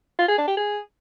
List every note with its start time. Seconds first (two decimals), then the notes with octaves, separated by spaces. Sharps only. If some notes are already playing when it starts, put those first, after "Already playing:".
0.19 F4
0.28 G#4
0.38 D4
0.47 G4
0.57 G#4